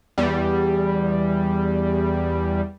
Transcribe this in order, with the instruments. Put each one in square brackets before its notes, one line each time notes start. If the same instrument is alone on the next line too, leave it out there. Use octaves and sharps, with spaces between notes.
[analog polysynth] E2 G3